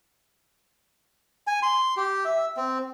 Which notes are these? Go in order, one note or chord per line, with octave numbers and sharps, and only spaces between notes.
G#5
C6
G4
E5
C4